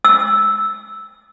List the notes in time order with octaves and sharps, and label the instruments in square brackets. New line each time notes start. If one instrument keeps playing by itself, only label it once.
[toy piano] E6